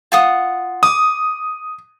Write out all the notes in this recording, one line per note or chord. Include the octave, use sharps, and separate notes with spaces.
F4 F#5 D#6
D6 D#6